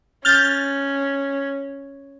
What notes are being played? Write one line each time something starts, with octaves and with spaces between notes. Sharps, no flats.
C#4 F6 G6 A6